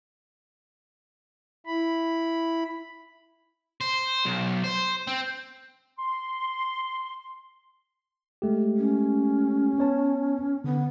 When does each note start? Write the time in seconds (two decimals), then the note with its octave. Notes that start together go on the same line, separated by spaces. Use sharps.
1.66 E4 B5
3.81 C5
4.25 B1
4.64 C5
5.07 C4
5.98 C6
8.42 G#3 A3 G4
8.77 C#4
9.79 B3 C#5 A5
10.64 D3 B3